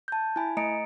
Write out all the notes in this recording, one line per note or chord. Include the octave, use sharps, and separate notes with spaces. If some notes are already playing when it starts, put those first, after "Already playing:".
A5 G6
E4 G#5 B5
A3 D#5 A#5 C#7 D7